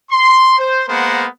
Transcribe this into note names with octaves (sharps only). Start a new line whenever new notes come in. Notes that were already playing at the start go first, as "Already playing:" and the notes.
C6
C5
G#3 A#3 B3 A#4 C5 F#5